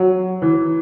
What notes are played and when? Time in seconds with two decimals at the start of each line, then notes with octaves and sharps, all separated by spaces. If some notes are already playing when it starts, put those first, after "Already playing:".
Already playing: F#3
0.42 E3